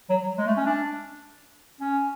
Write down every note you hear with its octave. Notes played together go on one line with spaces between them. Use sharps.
F#3
F#3
G#3
A3
C#4
D4
C#4